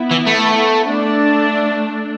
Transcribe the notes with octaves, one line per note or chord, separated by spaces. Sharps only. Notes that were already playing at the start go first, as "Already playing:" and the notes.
Already playing: B3 E4
E3
A3
A3 D4